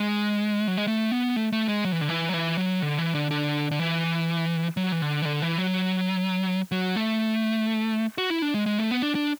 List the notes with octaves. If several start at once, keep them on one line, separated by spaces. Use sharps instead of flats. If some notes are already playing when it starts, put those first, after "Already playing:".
Already playing: G#3
F#3
G#3
A3
B3
A3
A3
G#3
F#3
E3
D3
E3
F#3
E3
F#3
D3
E3
D3
D3
D3
E3
F#3
E3
D3
E3
D3
E3
F#3
F#3
A3
F#4
E4
D4
G#3
G#3
A3
B3
D4
D4